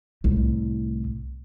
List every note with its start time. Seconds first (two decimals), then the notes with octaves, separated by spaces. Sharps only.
0.24 C2 A2